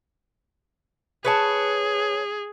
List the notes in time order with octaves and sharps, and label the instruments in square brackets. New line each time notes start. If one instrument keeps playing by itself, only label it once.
[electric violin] G#4 [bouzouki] B4 C#5 A5